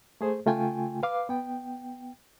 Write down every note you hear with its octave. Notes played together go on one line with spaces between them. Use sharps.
A3 G#4 C5
C#3 A3 F4 G5 G#5
B4 F5 D6
B3 G5